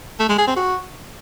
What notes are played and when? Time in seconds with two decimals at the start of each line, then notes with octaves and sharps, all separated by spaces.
0.20 A3
0.29 G#3
0.38 G#4
0.48 C4
0.57 F#4